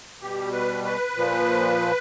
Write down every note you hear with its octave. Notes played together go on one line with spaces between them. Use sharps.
B2 G3 G4
B4
B4
A#2 F3